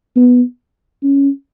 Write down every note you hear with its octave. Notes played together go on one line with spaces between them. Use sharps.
B3
C#4